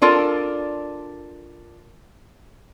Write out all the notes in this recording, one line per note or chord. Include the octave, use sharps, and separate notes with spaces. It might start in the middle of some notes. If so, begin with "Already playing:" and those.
D4 F4 A4 A#4